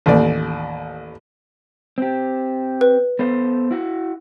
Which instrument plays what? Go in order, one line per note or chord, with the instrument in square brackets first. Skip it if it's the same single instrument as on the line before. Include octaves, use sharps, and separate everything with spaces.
[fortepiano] A1 D#2 D5
[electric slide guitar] C4 G4
[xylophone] B4
[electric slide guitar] B3 A4 C5
E4 F#4